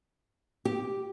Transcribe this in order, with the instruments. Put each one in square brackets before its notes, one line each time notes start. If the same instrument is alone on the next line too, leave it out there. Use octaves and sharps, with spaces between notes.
[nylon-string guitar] G4